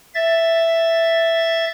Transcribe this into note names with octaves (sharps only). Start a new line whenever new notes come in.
E5 A6